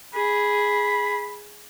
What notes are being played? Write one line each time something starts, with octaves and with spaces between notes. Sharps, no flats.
G#4 B5